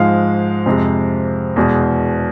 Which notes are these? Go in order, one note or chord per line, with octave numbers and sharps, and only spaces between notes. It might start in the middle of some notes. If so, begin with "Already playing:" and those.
Already playing: G#2 F3 G#3 F5
F2 C3 G#3
E2 B2 G#3